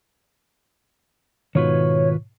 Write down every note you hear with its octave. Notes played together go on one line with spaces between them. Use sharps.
G#2 B2 D#3 F4 B4 C#5 C#6